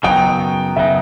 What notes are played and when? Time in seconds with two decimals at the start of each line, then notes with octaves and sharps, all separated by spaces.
0.03 F#2 C#3 F#3 B3 D#4 G5
0.76 F#2 C#3 F#3 B3 D#4 E5